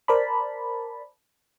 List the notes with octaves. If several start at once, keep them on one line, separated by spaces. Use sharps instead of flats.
A#4 C5 D5 A5 B5